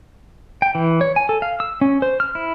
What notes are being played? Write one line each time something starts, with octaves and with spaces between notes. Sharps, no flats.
G5
E3
C#5
G#5
A4
F5
E6
C#4
C5
F6
E4